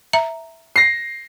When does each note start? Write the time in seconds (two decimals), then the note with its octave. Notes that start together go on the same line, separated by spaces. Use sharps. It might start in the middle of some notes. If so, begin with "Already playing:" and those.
0.13 E5 A#5
0.76 A#6 C7